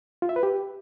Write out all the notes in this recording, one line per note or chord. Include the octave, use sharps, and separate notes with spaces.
F4
E5
B4
G4